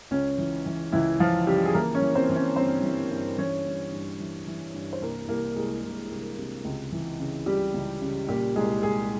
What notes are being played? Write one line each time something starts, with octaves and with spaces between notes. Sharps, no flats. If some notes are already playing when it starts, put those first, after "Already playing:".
C#2 C#4
E3
E3
C#2 E3 E4
E3 F3 F4
C#3 G3 G4
G#4
E3 A#3 A#4
C#4 C#5
E3
C4 C5
E3
C#4 C#5
G2 C4 C5
E3
G2
E3 C#4 C#5
G2
G2
E3
E3
G2
C5
C2 A#3 A#4
C2 A#3 A#4
C2 G#3 G#4
C2
C2
C3
C#2
E3
C#3
C#2 G3 G4
C#2
C#3
A#2 G3 G4
C2 G#3 G#4
C2 G#3 G#4